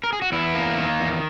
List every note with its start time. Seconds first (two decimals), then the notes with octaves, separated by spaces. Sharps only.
0.04 A#4
0.13 G#4
0.22 F#4
0.32 E2 E4
0.54 A#3
0.78 D#3
1.00 E2